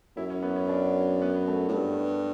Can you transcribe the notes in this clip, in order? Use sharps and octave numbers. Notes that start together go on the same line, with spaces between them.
F#2 E4
C#4
B3
C#4
D4
B3
A3
A2
G2